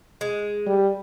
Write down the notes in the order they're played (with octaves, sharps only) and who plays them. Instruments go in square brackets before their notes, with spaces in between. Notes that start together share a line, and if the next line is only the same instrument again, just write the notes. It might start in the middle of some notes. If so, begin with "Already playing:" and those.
[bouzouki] G#3
[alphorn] G3